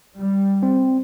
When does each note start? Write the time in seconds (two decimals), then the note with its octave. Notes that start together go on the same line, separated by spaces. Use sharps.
0.18 G3
0.63 C4